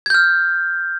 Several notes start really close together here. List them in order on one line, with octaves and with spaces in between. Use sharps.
G#6 G6 F6